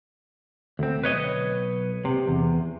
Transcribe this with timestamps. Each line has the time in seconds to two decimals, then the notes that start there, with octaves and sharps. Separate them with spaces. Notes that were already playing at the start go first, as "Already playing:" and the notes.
0.79 D2 C4
1.02 B1 B4 C#5 D#5
2.05 C3
2.27 E2